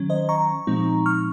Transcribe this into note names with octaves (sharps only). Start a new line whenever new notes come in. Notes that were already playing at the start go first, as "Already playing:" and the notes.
Already playing: D#3 F#3 C#4
C5 D#5
A#5 C#6
A#2 F3 G#3 C4 D#4
C#6 F6